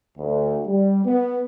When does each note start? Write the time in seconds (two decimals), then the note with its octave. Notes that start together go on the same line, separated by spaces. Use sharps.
0.17 D2
0.67 G3
1.05 B3